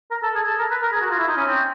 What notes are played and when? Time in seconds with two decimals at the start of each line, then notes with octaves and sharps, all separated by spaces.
0.11 A#4
0.23 A4
0.35 G#4
0.47 A4
0.59 A#4
0.71 B4
0.83 A#4
0.92 G#4
1.01 F#4
1.10 F4
1.19 E4
1.28 D#4
1.37 C#4
1.46 C4